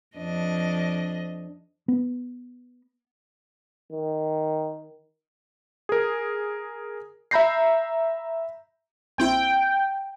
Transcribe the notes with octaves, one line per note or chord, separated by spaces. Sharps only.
F2 D4 D#5
B3
D#3
G#4 A#4
E5 A#5 B5 G6 A#6 C7
A#1 C4 E4 G5